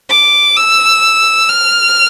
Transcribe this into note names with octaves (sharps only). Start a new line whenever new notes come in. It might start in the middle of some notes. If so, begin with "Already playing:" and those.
D6
E6
F6